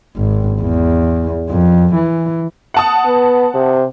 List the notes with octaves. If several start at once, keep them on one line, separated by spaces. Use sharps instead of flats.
G#1
E2
F2
E3
F#5 A5 D#6
B3
C3